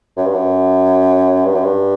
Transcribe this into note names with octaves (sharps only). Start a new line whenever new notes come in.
F#2
G2
F#2
G2
F#2
G2